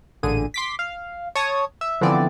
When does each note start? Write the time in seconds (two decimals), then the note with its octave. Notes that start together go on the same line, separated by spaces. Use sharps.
0.23 A1 A#2 D3 G#4 D#7
0.54 C6 D6 B6
0.79 F5
1.35 C#5 A5 C#6 D#6
1.81 E5
2.01 D3 E3 F3 B3 C4 D5